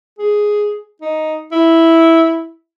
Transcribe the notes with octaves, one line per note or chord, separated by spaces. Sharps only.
G#4
D#4
E4